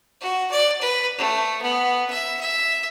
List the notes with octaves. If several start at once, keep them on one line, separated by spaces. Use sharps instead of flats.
F#4
D5
B4
A3
B3
E5
E5